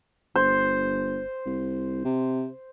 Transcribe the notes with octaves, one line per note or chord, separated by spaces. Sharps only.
G1 C5
C2
C3